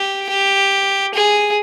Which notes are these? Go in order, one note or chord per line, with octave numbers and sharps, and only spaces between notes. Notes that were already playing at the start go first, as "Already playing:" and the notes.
Already playing: G4
G4
G#4